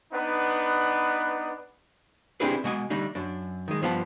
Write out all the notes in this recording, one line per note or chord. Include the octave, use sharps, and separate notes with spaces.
B3 D4 D#4 B4 F#5
C4 D4 E4 G4 G#4 B4
B2 G#3 F#5 G#5
D3 G3 A3 D4 D#4
F#2 D4
D#3 G#3
G2 F3 B3 A5